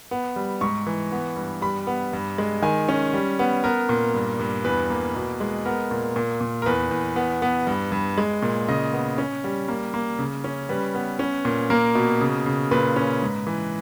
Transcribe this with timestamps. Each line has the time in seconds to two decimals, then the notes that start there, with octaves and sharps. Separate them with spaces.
0.11 B3
0.36 G3
0.61 G#2 C#6
0.86 E3
1.12 B3
1.36 G2
1.62 G3 B5
1.87 B3
2.13 G2
2.38 G#3
2.62 D#3 G#5
2.89 C#4
3.13 G3
3.39 B3
3.64 B3 A#4
3.89 A#2
4.14 G2
4.39 G2
4.64 E2 B4
4.90 A#3
5.15 B2
5.40 G#3
5.65 B3 A#4
5.91 A#2
6.16 A#2
6.41 A#2
6.62 A#4
6.66 E2 B4
6.91 E2
7.16 B3
7.42 B3
7.67 G2
7.92 G2
8.17 G#3
8.42 A#2
8.68 C#3 D#5
8.93 B3
9.18 C#4
9.44 G3
9.68 A#3
9.94 A#3
10.19 C#3
10.44 C#4
10.69 G3 B4
10.95 B3
11.19 C#4
11.45 A#2
11.70 A#3 A#4
11.95 B2
12.21 C#3
12.46 C#3
12.71 A#2 B4
12.96 C#4
13.22 G#2
13.47 E3